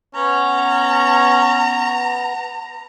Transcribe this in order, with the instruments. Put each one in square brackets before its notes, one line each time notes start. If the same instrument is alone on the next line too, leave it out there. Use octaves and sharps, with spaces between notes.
[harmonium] B3 [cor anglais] C#4 [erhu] A#5